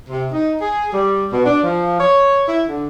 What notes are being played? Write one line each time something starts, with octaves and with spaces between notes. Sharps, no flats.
C3
D#4
G#4
G3
B2
D4
F3
C#5
E4
D3